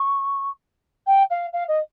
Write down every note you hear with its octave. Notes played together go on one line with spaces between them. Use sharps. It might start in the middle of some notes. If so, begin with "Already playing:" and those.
Already playing: C#6
G5
F5
F5
D#5